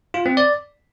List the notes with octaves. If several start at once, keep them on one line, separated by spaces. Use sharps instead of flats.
F4
C4
D5